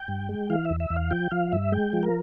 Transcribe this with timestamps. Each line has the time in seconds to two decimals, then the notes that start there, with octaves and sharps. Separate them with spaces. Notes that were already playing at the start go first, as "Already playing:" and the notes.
Already playing: G5
0.08 G2
0.29 G#3
0.50 E3 F5
0.65 E5
0.70 E2
0.80 E5
0.90 E2
0.96 F5
1.11 F3 G5
1.31 F3 F5
1.52 G2 E5
1.72 G#3 G5
1.93 F3
2.03 A#4